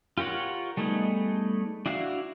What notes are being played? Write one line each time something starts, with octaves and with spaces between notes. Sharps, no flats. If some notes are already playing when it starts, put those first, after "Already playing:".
F4 G4 A#4 C#5 F#5
G3 A3 B3 D#4 G#4
D4 E4 F#4 F5